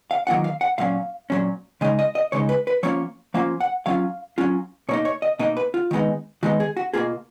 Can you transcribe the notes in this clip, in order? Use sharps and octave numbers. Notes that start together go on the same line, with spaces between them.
F5
D#3 F#3 A#3 C#4 F4 F#5
F5
F#5
A#2 F#3 C#4 F5
A#2 F#3 C#4
C#3 G#3 D#4 D#5
D#5
D#5
C#3 G#3 D#4 C#5
B4
B4
F3 A#3 C#4 F4 C#5
F3 A#3 C#4 F4 F5
F#5
F#3 C#4 F4 F5
F#3 C#4 F4
B2 A#3 D#4 C#5
C#5
D#5
B2 A#3 D#4 D#5
B4
F4
D#3 G#3 B3 D#4
D#3 G#3 B3 D#4 F#4
G#4
F#4
B2 A#3 F4 G#4